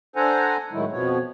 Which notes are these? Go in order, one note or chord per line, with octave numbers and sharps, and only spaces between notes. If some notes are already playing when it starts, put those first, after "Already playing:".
D4 A4 C5 F#5 G#5 A#5
A2 D#3 F#3 G#3 A3 E4
F2 B2 F3 B3 C#5